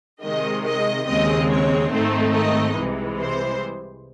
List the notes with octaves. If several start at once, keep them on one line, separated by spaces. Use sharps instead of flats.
C3 D#3 G#3 D#5
D#5
D#2 C#3 G#3 C4 D#5
C#5
G#2 D#3 A3 C4 D#4 C5
D#5
C2 C3 E3 G#3
C5